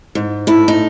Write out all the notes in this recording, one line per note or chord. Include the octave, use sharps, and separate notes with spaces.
G#2
A2 E4
D#4